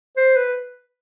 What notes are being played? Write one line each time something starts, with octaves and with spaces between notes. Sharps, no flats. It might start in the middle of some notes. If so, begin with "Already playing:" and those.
C5
B4